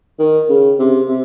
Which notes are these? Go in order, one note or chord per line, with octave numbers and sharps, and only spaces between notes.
D#3
C#3
C3
C3